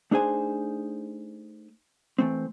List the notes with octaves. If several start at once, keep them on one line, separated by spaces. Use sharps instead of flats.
A3 D4 D#4 G#4 C5 G#5
E3 A3 C4